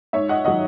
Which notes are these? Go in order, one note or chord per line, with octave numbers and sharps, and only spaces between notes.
G#2 C#5 E5
D#5 F#5
D#3 F#3 D#5 F#5